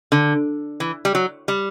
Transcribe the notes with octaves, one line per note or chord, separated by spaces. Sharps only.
D3
E3
G3
F#3
G3